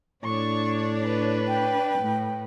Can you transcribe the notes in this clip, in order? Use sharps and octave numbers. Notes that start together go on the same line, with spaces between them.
A2 D4 C#5 C#6
B4
G5
A2